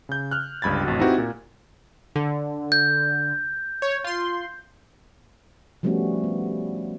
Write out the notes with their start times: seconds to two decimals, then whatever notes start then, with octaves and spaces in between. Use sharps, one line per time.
0.09 C#3 G6
0.31 F6 F#6
0.62 G1 C#2 G2 B5 G#6 A6
0.84 A1 F2 F#4
1.00 C4 D#4 E4 F#4 G4 B4
1.18 A#2
2.16 D3
2.72 G6
3.82 C#5
4.04 F4 C6
5.83 F3 G3 A3 B3 C#4 F#4
6.24 B3